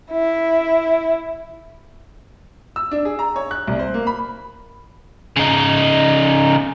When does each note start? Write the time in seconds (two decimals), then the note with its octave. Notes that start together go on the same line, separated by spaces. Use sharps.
0.11 E4
2.76 E6
2.91 D4
3.05 G#4
3.19 A#5
3.36 C#5
3.51 F#6
3.67 C2
3.79 C5
3.94 A#3
4.07 B5
5.36 C#3 D#4